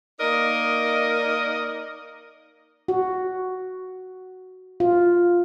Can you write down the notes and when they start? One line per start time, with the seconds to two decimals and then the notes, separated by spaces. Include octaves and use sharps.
0.20 A#3 D#4 A#4 D5 D#5
2.88 F#4
4.80 F4